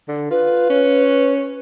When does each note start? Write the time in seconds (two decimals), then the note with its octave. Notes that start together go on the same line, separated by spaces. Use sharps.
0.08 D3
0.31 F4 B4
0.70 C#4